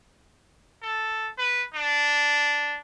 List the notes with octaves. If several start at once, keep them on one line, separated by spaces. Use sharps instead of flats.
A4
B4
D4